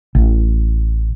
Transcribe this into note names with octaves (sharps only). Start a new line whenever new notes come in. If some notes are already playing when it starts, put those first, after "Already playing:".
A1